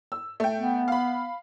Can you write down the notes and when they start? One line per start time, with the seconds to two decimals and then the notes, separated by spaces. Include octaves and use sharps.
0.12 E6
0.40 A3 G5
0.58 B3
0.88 F5 B5